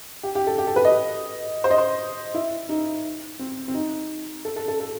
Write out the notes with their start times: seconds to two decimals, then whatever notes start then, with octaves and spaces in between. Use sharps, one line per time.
0.23 G4
0.35 G4
0.47 A4
0.58 G4
0.67 A4
0.76 B4
0.85 D#5
1.64 C5
1.71 D#5
1.78 C5
2.34 E4
2.69 D#4
3.39 C4
3.68 C4
3.74 D#4
4.45 A4
4.56 A4
4.68 A4
4.80 A4